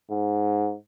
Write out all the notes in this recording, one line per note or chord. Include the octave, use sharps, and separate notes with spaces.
G#2